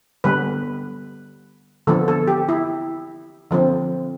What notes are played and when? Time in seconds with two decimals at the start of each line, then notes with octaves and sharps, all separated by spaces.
0.24 D3 G3 B3 B4
1.87 D3 F3 B3 A4
2.08 A4
2.28 G4
2.49 E4
3.51 D3 F3 C4